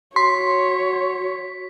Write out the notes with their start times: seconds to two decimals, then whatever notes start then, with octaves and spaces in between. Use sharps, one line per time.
0.16 F#4 C#5 C6 B6